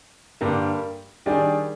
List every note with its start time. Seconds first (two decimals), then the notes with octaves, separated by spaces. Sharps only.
0.41 G2 D3 G3 A#3
1.26 D#3 G3 D4 G#4 D5